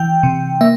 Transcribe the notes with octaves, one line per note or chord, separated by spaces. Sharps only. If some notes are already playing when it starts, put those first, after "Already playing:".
Already playing: E3 G5
C3
A#3 E5